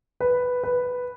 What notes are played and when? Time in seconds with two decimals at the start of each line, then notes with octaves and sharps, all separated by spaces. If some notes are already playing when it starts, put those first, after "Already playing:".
0.20 B4
0.63 B4